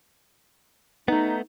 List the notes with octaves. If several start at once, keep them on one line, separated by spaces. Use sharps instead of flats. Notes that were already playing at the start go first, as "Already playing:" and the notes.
A3 B3 D#4